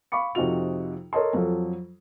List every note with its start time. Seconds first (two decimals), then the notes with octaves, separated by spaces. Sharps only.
0.12 F5 B5 C#6 D6 C#7
0.35 F2 C3 D#4 F4 F#4 F7
1.13 A4 A#4 C#5 D#5 A5 C6
1.33 F2 F#3 F4 A4